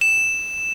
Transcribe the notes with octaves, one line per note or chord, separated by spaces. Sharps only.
E7